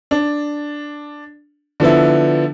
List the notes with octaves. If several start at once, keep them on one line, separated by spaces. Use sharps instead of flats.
D4
D3 F3 B3 E4